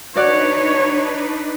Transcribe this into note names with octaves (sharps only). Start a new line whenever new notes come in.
D4 D#4 F#4 B4 C#5 D5 F#6